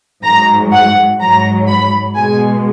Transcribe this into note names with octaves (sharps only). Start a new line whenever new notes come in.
G#2 F#3 A#5
F#5
G#2 F#3 A#5
B5
B2 G#3 G#5